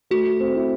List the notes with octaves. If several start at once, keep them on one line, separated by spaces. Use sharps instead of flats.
A3 F#4
A3
C4
E4